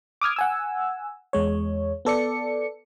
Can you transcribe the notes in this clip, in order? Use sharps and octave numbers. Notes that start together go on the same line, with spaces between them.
D6 D#6 F6 G#6
F#5 G#5 E6
E2 G#3 C#5
B3 A4 D5 C#7